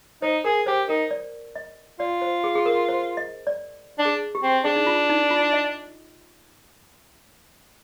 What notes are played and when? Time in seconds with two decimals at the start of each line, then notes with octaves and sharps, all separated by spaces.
0.22 D#4 C5
0.45 G#4 A#4
0.66 G4 C5
0.89 D#4 A#4
1.11 D5
1.55 D#5
2.00 F4 D5
2.22 C5
2.44 G#4
2.55 G#4
2.66 A#4
2.88 C5
3.17 D#5
3.47 D5
3.99 D4
4.05 G#4
4.35 G4
4.43 C4
4.65 D4 G#4
4.76 D#4
4.87 F4
5.09 D#4
5.31 F4
5.53 D#5